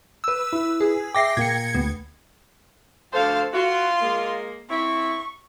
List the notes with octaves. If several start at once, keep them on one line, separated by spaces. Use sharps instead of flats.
B4 E6
E4
G#4
E5 G5 D6 A#6 C7
A#2 A#3 G#6 C#7
D2 B3
D2 F3 A4 C5 F5
F4 F#4 C6
G#3 A#3
C4 E4 C#6